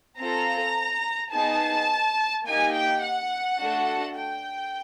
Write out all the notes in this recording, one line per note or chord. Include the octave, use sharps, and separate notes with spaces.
C4 F4 A4 A#5
B3 D#4 G#4 A5
A#3 D#4 G4 G#5
G5
F#5
A3 D4 F#4 A4
G5